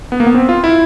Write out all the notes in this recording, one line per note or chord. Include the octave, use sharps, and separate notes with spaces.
B3
A#3
B3
C4
F4
E4